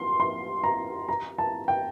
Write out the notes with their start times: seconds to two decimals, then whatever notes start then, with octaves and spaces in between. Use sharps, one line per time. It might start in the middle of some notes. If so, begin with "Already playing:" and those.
Already playing: C6
0.20 C6
0.64 A#5
1.09 A#5
1.38 A5
1.68 G5